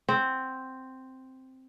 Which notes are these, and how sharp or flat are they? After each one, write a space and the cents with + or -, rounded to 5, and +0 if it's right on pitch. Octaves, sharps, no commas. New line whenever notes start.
C4 +0 F#5 +0